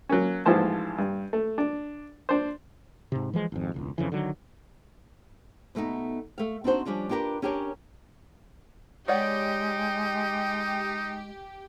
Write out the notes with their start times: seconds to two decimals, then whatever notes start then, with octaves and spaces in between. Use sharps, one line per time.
0.09 F#3 A#3 C#4
0.45 A1 G#2 E3 F3 C5 A5
0.98 G2
1.33 A3
1.58 D4
2.29 D4 C5
3.12 G#2 C3
3.33 E3 F3 G#3
3.52 G#1 F2
3.74 E1 C#2
3.98 F2 C#3 E3
4.12 D3 D#3 F#3
5.75 B2 A3 B3 D#4
6.38 A3 F5
6.64 C4 D4 D#4 F#4 C5
6.85 F3 G3 C#4 D4 F4
7.09 D4 F4 G4 A#4 B4
7.42 C#4 D4 G4 A#4 C5 C#5
9.08 G#3 D#4 G4 C#5 D5 F#5